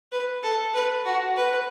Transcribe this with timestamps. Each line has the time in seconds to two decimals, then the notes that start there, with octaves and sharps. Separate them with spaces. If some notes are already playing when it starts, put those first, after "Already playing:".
0.12 B4
0.43 A4
0.74 B4
1.05 F#4
1.36 B4